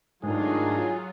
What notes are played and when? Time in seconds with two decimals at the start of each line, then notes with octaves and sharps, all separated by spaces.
0.24 G#2 D#3 F#3 A3 D4 F4 G#4